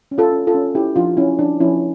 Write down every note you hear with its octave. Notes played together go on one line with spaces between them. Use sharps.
C#4
F4 A4
C#4
F4 A4
C#4
C#4 E4 G4
F3 D4 F4
C#4 E4
F3 D4
F3 C#4 E4